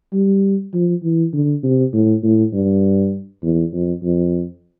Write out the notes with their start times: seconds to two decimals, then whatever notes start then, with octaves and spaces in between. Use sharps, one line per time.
0.14 G3
0.74 F3
1.03 E3
1.34 D3
1.63 C3
1.93 A2
2.23 A2
2.53 G2
3.43 E2
3.73 F2
4.02 F2